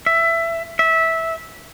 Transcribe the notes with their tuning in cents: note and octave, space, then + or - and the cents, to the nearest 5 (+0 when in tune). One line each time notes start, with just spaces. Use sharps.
E5 +20
E5 -15